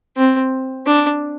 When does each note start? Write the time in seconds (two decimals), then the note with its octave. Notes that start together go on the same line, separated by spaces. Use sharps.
0.17 C4
0.87 D4